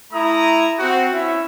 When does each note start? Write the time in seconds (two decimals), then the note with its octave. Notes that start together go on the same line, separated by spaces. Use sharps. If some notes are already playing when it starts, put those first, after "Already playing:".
0.12 A3 E4 A#5 D#6
0.79 C4 F#4
1.12 C#4 E4 E5